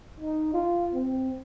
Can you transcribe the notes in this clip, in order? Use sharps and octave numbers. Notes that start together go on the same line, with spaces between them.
D#4
F4
C4